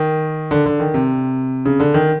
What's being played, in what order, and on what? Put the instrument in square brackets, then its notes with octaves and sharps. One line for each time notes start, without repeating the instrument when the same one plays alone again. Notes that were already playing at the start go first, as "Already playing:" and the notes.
Already playing: [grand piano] D#3
D3
D3
D#3
C3
C#3
D3
D#3